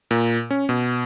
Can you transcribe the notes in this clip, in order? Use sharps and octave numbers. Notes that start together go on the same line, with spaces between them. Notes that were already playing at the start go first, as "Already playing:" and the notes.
A#2
C#4
B2